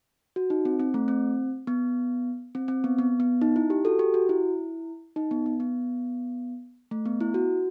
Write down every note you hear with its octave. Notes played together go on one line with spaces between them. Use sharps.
F#4
D#4
C4
C4
A3
C4
B3
C4
C4
B3
B3
B3
D#4
E4
G4
F#4 A4
G4
F#4
E4
D#4
B3
B3
B3
A3
B3
E4
F#4